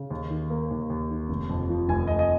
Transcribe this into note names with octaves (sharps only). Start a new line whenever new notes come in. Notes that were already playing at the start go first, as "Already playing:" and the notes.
Already playing: C#3
D#2
D#3
A#3
D#2
D#2
D#3
F1
F2
F3
F1 G#5
F1 D#5
D#5